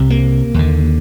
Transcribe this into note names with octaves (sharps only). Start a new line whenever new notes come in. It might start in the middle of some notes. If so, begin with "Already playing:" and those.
Already playing: C2 C3
A#3
D#2 D3